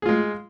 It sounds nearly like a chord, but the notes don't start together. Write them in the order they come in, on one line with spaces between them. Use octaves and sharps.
G#4 F4 G#3